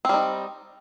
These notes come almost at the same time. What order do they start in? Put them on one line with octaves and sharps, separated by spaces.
C4 G3 D#4